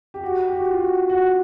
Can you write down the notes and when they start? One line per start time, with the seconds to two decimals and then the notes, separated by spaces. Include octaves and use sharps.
0.14 G4
0.23 F#4
0.47 G4
0.52 F#4
0.70 F4
0.80 F#4
1.09 F#4